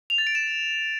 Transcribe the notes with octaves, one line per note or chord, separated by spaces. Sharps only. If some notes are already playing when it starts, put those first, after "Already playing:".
F7
A6
D7
E7